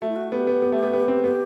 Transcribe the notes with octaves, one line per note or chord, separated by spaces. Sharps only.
A3 F#4
E4
F#4
B3 G4
B3
B3
A3
B3
B3
C4
B3 G4